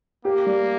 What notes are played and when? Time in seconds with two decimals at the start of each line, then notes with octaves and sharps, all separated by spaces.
0.25 A#3 G4
0.46 G3